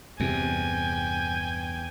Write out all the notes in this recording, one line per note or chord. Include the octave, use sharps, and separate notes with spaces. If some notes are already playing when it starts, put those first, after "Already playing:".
E2 G2 C3 G5 G#5